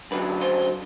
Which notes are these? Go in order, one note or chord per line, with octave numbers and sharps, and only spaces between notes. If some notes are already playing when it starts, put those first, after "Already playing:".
F#2 D3 F#3 B4
C5